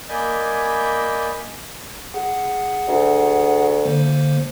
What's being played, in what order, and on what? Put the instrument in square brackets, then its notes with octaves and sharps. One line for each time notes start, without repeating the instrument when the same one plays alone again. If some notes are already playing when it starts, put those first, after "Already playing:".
[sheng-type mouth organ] A#3 D5 D#5 G#5 B5 G6
[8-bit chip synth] G#4 F#5
[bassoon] D2
[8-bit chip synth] D3 A#3 C5